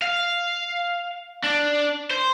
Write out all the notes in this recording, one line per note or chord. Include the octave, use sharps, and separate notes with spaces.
F5
D4
C5